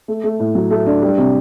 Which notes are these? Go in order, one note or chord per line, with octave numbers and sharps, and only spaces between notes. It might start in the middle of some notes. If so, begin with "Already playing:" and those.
A3
A3
A2
F#3
A3
D4
G3
C3